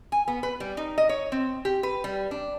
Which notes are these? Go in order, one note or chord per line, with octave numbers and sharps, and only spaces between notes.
G#5
B3
B4
G3
D#4
D#5
C#5
C4
G4
B4
G3
D4